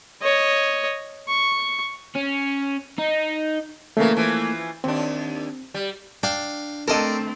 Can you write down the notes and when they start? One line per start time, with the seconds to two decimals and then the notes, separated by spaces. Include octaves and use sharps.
0.22 C#5 D#5
1.28 C#6
2.16 C#4
2.99 D#4
3.97 C#3 E3 A3 A#3
4.17 E3 F3
4.84 D#2 C4 D4
5.74 G3
6.23 D4 F5 G5
6.88 A3 C4 A4 A#4 D5 D#5